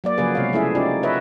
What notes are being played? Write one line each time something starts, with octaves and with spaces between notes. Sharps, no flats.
F#3 A#3 D5
C#3 F3 F#3 A#3 G#4 B4
C3 G#3 B3 C#5 F5
F3 A3 C#4 E4 G#4 E5
C#4 D#4 F4 G4 D5
F#4 B4 C#5 D#5 E5